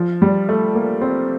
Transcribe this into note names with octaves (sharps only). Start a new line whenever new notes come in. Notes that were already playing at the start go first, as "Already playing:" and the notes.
Already playing: F3
G3
A3
A#3
C4